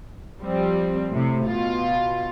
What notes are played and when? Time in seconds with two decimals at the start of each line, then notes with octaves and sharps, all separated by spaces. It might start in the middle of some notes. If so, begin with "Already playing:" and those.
0.40 F3 G3 C4
1.11 A2 C3
1.47 B2 F4